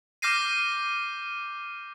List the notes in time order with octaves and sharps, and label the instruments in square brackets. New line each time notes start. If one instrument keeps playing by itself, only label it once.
[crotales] D6 F6 G6 A#6 C7 D#7